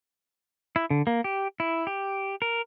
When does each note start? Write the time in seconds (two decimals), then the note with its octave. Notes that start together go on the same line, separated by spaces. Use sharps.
0.76 E4
0.90 D3
1.07 A#3
1.24 G4
1.60 E4
1.87 G4
2.42 A#4